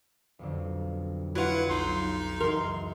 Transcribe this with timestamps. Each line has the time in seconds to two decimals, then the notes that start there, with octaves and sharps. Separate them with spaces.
0.39 B1 F2 D3
1.35 F#3 C#4 E4 F4 B4 F#5
1.69 B1 C#4 D#4 C6
2.40 C#2 F#2 E3 A#4 C6